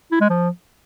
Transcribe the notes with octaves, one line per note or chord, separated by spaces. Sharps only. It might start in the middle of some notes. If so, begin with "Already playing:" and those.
E4
G#3
F3